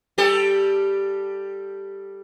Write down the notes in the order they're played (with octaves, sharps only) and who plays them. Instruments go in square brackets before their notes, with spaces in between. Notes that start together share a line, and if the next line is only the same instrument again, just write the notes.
[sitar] G3 G4 A4